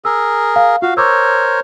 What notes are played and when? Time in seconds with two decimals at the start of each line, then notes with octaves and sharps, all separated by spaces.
0.05 G#4 A#4 E6
0.56 F5
0.82 F4 F#4 F5
0.97 A#4 C5 C#5 C#6 D6 E6